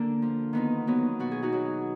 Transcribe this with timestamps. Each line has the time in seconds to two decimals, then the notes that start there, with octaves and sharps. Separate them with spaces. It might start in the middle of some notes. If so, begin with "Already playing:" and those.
Already playing: D3 A#3 D4
0.22 F3
0.53 D#3 B3 D#4
0.87 F#3 B3 D#4
1.20 B2 F#4
1.31 G#4
1.42 D#4 F#4
1.52 F#3